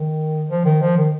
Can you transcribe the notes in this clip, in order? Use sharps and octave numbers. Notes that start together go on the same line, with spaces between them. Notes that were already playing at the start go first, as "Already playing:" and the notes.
Already playing: D#3
F3
D#3
F3
D#3